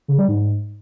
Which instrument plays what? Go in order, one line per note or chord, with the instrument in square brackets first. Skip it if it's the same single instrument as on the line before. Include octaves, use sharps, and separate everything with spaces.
[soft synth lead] C#3
G3
G#2